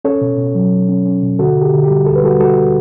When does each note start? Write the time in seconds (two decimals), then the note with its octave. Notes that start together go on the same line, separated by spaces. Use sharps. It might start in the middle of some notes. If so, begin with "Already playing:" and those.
0.05 C#4 A4 C#5
0.21 B2
0.38 B2
0.55 F#3
0.72 F#3
0.89 C#4
1.06 C#4
1.23 B2
1.39 D3 F#4 A4
1.56 D3
1.61 G4
1.73 D3
1.84 G4
1.90 G3
2.06 D2 A4
2.16 B4
2.23 G3 F#4 A4
2.40 G3 F#4 A4